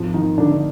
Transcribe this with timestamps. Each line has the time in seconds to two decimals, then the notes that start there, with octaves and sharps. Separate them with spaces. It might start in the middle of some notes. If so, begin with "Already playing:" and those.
Already playing: G#1 F3 F4
0.14 D#3 D#4
0.37 G#1 D3 D4
0.52 D4